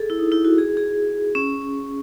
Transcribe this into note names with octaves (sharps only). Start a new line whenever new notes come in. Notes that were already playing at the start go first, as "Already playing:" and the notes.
Already playing: G#4 A4
E4
D#4
E4
F#4
G#4
G#4
C#4